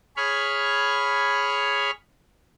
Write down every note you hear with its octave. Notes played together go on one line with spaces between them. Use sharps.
G#4 C#5 B5 C#6 F6